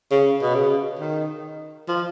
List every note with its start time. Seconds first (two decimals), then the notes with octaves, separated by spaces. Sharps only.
0.11 C#3
0.42 B2
0.55 C#3
0.99 D#3
1.88 F3